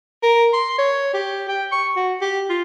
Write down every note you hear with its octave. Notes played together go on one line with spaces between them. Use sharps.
A#4
C6
C#5
G4
G5
C#6
F#4
G4
F4